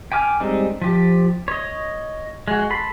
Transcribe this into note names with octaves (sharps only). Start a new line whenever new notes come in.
G5 G#5 D6 F6
G3 G#3 C4 D#4
F3 G4
C#5 D#5
G#3 F#4
A4 B5 C6